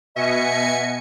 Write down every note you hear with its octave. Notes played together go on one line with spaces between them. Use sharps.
B2 D#5 E5 G#5 C#7